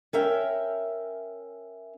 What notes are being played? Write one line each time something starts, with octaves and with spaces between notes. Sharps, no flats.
C#4 A#4 E5 G5